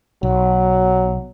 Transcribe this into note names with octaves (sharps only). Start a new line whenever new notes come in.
B1 F#3